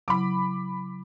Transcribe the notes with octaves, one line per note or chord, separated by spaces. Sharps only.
C#3 F#3 E4 B5 D6